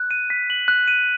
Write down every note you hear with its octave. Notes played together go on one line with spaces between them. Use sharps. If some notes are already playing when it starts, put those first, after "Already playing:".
Already playing: F#6
D#7
B6
F#7
F#6
D#7